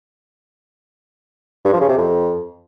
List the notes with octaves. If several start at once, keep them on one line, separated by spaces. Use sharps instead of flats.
G2
F3
C#3
C3
F2